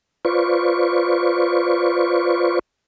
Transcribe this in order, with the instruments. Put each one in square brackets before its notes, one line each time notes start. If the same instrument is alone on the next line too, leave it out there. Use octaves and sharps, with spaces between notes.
[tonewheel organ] F4 B4 C5 D5 C#6